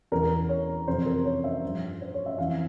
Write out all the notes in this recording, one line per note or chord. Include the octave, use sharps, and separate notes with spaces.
E2 E3 A#4
C#5
F2 C3 E3 C5
A#4
C#5
E5
G2 F3
C5
C#5
E5
F2 E3 F5